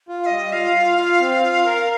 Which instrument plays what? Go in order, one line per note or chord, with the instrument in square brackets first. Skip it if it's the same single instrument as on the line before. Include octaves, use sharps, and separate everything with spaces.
[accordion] F4
[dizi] F5
[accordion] G3 [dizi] D#5
[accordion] F4 [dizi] F5
[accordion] F4
F4
C4
F4
A#4